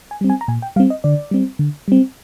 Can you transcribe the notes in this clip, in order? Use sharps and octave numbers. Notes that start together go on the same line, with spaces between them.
G#5
G3 C4
G#5
A#5
A#2 G#5
G5
G3 C4 F5
D#5
D3 D5
G3 C4
D3
G3 C4